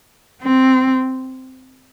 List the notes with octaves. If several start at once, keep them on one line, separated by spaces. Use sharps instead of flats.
C4